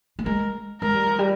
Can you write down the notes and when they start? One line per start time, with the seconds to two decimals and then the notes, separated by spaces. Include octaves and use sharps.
0.19 A#3
0.25 G#3 A#4
0.81 G#3 A#4
0.94 G3
1.06 F3
1.19 G3